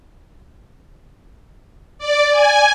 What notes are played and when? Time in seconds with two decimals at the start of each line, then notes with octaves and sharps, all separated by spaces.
1.98 D5
2.31 G#5